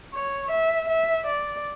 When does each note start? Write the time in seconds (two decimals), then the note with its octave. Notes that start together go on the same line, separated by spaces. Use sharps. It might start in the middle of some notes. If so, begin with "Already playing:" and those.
0.14 C#5
0.51 E5
0.89 E5
1.27 D5